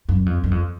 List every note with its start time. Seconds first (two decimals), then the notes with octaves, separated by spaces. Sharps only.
0.09 F#2
0.26 F2
0.44 F#2
0.51 F2